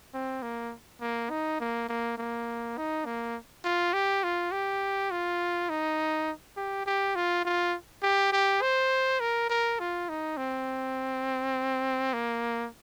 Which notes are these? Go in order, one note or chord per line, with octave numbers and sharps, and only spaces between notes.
C4
A#3
A#3
D#4
A#3
A#3
A#3
D#4
A#3
F4
G4
F4
G4
F4
D#4
G4
G4
F4
F4
G4
G4
C5
A#4
A#4
F4
D#4
C4
A#3